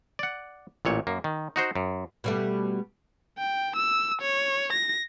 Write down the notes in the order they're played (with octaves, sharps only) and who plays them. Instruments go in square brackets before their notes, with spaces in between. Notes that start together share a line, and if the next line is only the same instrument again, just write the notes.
[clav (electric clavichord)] D5 F#5
A1 A#2 C#5
F#2 A#3
D#3
D#4 F#4 C5
F#2
[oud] B2 G3 A3
[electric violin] G5
E6
C#5
A#6